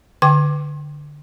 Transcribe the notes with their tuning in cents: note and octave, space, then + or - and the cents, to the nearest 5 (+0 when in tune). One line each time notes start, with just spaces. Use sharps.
D3 +0 G5 +0 D6 +0